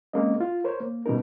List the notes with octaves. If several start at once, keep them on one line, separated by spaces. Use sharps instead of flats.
G#3 A#3 C4 C#4 D#5
F4
A#4 C5 C#5
A#3
B2 G3 C#4 D#4 A#4